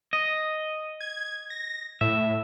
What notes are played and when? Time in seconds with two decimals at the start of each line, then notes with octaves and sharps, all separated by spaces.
0.13 D#5
1.01 G#6
1.50 A#6
2.01 A2 E5